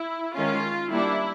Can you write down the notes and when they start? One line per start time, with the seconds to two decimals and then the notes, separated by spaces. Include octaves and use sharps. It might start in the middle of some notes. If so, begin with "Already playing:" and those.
Already playing: E4
0.35 D#3 G#3 C#4 F4
0.91 G3 A#3 D4 E4